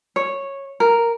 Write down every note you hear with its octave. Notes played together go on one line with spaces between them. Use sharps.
C#5
A#4